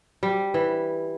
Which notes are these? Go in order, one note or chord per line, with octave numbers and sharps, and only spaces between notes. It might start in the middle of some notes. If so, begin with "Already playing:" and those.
G3
E3